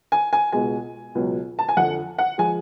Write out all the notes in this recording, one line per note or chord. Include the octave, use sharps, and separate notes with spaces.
G#5
G#5
C#2 B2 G#3 G#5
C#2 B2 F#3
A5
G#5
F2 D3 F3 F#5
F#5
F3 G#3 G#5